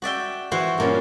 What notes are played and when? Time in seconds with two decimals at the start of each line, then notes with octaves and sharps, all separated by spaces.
0.02 F#4 D5 E5 G5
0.51 E3 F#4 C5
0.78 G2 A#2 C#4